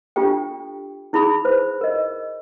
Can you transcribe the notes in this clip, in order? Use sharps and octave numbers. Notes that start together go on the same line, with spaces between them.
D4 F4 G4 A4 G5
D#4 E4 G#4 B5 D#6
B4 C5
A#4 D#5